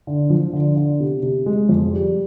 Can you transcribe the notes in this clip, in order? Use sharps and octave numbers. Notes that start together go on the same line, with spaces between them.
D3
F3
D3
D3
C3
C3
G#3
F2
G3